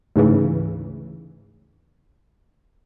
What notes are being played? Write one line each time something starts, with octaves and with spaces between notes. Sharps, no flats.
D2 G#2 C#3 E3